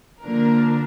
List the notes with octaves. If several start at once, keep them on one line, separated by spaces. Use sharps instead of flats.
D3 F3 A#3 D4 A#4